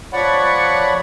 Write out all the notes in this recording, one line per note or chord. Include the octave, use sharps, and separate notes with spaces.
F3 C#5 D5 F#5 B5 C#6